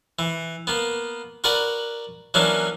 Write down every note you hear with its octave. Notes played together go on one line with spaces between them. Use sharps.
E3
A#3 B3
F#4 A#4 B4 D5 F#5
E3 F#3 A#3 C#4 D4